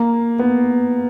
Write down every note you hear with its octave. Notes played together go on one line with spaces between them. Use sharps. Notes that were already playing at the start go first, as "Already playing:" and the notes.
Already playing: A#3
B3